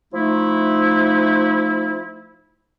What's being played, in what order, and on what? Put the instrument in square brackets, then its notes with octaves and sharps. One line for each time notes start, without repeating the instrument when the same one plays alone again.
[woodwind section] F3 A3 D#4 E4